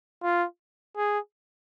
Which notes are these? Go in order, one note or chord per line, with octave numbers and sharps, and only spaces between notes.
F4
G#4